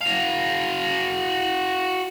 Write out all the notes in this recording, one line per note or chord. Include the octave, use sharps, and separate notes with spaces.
F#4 F5